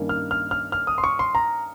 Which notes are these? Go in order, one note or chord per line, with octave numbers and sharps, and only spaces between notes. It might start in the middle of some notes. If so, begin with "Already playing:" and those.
Already playing: G2 D#3 A#3 C#4
F6
F6
F6
F6
D#6
C6
C#6
C6
A#5